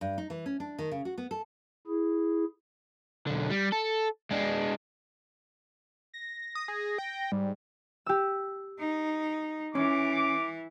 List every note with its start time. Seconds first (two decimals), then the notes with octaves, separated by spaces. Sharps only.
0.01 G2
0.18 D#4
0.30 E3
0.46 C#4
0.60 D4
0.79 D#3
0.91 C#3
1.05 F#4
1.18 B3
1.31 A4
1.87 E4 G#4
3.27 B1 D3
3.50 G3
3.72 A4
4.31 G#3 D4
6.14 A#6
6.55 D#6
6.68 G#4
6.98 G5
7.32 G#2 G3
8.06 G4 E6
8.79 D#4
9.75 E3 C#4 D6